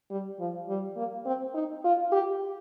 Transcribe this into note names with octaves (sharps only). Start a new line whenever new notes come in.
G3
F3
G3
A#3
C4
D#4
F4
G4